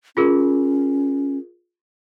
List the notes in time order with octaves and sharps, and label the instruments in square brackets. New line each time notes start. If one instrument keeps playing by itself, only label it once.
[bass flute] C#4 [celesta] F4 G#4 A#4